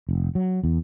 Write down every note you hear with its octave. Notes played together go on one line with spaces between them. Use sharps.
F1
F#3
E2